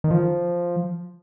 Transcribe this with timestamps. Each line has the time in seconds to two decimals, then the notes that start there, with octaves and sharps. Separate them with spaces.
0.04 D#3
0.11 F3